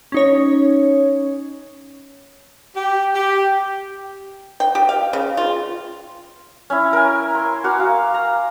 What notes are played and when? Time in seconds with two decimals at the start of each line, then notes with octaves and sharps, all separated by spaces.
0.12 C#4 D#4 C#5
2.76 G4
3.15 G4
4.60 G5
4.75 G4
4.89 F5
5.13 C#3
5.37 F4
6.70 C#4 E4
6.93 A#4 G#5
7.35 C6
7.64 F#4 A#4 D6
7.80 F5
8.14 A#5